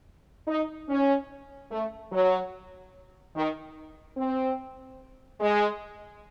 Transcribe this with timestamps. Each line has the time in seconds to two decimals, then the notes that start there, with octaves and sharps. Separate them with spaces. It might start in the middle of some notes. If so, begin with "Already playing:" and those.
0.48 D#4
0.89 C#4
1.71 A3
2.12 F#3
3.36 D#3
4.17 C4
5.40 G#3